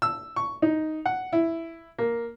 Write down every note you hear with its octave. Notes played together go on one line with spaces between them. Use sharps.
E6
C#6
D#4
F#5
E4
A#3